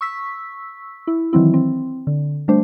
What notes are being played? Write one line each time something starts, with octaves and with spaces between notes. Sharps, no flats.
C#6 E6 B6
E4
D#3 E3 F#3 C4 E4
C4
D3
G3 A3 D4 C5